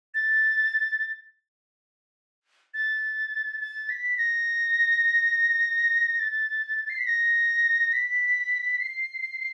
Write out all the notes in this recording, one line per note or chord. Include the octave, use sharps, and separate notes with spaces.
A6
A6
A6
B6
A#6
A6
C7
B6
A#6
B6
C7